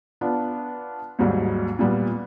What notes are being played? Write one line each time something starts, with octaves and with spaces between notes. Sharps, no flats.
B3 D4 F4
D#2 G#2 F#3 G3
A#2 G3 B3